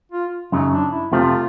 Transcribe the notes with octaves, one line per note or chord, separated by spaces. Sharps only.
F4
F#2 C#3 F#3 D#4
D4
E4
F2 C3 F3 A3 C4 F4